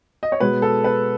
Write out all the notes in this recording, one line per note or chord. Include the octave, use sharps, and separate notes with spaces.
D#5
C#5
B2 G#3 B4
A4
B4